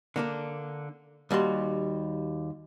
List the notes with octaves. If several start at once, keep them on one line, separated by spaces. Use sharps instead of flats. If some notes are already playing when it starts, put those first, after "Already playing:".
D3 A#3 D4
D#2 G3 F#4 C6